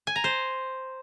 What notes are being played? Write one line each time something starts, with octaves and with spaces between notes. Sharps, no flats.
G#5
A#5
C5